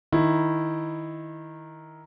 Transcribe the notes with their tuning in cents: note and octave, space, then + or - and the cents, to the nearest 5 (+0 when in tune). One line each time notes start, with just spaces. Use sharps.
D#3 +0 E4 +0